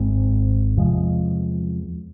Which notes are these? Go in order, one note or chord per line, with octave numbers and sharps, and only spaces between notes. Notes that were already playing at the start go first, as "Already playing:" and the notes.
Already playing: G#1 G#2 G#3 C4
E2 C3 F3 G#3